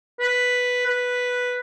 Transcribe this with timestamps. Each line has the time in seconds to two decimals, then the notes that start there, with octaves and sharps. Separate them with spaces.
0.20 B4
0.86 B4